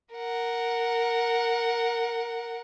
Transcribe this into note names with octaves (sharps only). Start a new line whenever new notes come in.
A#4 F#5